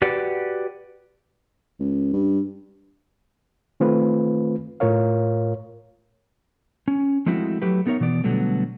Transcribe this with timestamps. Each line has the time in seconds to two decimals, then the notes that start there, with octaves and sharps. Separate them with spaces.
0.02 F#4 G4 B4 D5 F#5
1.80 C#2
2.13 G2
3.80 D#3 A3 C4 F4 B4
4.80 A2 F4 A#4 C#5 F5
6.88 C#4
7.26 F3 G#3 A3 C4 E4 F#4
7.62 F#3 A3 G4 B4
7.86 A3 B3 D#4 A#4 C#5 E5
8.00 B2 E3 B3 D5
8.24 B2 D3 F#3 G3 A3 B3